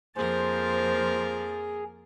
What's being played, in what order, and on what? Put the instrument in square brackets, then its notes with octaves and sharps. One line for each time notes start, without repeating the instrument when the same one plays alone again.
[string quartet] F2 F3 A6 [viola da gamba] A#3 A#4 [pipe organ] G#4 [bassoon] C5